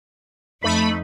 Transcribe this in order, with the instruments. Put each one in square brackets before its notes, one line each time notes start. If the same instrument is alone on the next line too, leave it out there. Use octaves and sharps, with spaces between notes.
[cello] F2 D#4 [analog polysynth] A3 B5